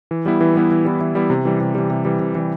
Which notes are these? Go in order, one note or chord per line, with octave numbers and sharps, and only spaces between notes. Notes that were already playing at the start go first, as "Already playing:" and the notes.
E3
G3 B3 E4
E3
G3 B3 E4
E3
G3 B3 E4
E3
G3 B3 E4
C3
E3 G3
C3
E3 G3
C3
E3 G3
C3
E3 G3